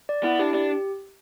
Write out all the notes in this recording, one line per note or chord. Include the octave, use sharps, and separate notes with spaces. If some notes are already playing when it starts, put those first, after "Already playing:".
D5
B3 E4
D4 G4
D4 G4